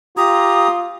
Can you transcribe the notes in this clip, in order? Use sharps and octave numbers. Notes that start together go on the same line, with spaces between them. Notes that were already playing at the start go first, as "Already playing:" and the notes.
F4 G4 A#5 D#6